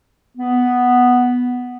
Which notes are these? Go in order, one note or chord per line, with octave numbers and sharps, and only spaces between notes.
B3